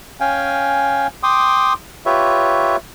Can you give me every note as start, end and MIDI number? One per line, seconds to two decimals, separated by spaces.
0.20 1.07 61
0.20 1.07 77
0.20 1.07 79
0.20 1.07 80
1.23 1.73 79
1.23 1.73 84
1.23 1.73 86
1.23 1.73 87
2.06 2.76 65
2.06 2.76 67
2.06 2.76 71
2.06 2.76 73
2.06 2.76 76